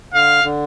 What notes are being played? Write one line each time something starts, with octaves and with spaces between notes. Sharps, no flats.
D3 F5
D3